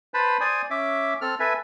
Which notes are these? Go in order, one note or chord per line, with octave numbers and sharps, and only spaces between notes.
B4 C5 A5 B5
C5 D5 G#5 D#6
C#4 E5 D6
C4 A4 F6
A4 B4 E5 G#5